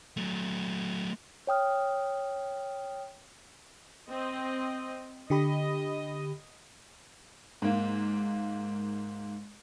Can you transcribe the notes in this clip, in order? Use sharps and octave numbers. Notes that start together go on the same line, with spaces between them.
F#3 A3
C#5 G5 D#6 F6
C4 D#5
D3 G4 D#5 B5
G#2 A#3